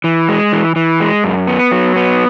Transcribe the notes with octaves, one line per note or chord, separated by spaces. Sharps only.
E3
G#3
E3
E3
G#3
F#2
B3
F#3
B3